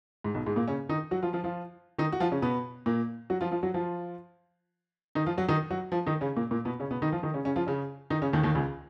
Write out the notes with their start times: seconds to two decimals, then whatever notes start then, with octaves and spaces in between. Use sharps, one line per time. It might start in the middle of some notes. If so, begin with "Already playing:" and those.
0.24 G#2
0.34 B1 B2
0.46 G#2 G#3
0.56 A#2 A#3
0.68 C#3 C#4
0.89 D#3 D#4
1.11 F#3 F#4
1.23 F3 F4
1.33 F3 F4
1.44 F3 F4
1.98 D#3 D#4
2.12 F#4
2.20 F3 F4
2.32 C#3 C#4
2.42 B2 B3
2.86 A#2 A#3
3.30 F#3 F#4
3.41 F3 F4
3.51 F3 F4
3.63 F#3 F#4
3.74 F3 F4
5.15 D#3 D#4
5.26 F3 F4
5.38 F#3 F#4
5.48 D#3 D#4
5.71 F#3 F#4
5.92 F3 F4
6.06 D#3 D#4
6.21 C#3 C#4
6.36 A#2 A#3
6.51 A#2 A#3
6.65 B2 B3
6.80 C#3 C#4
6.91 B2 B3
7.02 D#3 D#4
7.12 F3 F4
7.23 D#3 D#4
7.34 C#3 C#4
7.45 C#3 C#4
7.56 F3 F4
7.67 C#3 C#4
8.10 D#3 D#4
8.22 C#3 C#4
8.33 D#2 D#3
8.43 D#2 D#3
8.55 C#2 C#3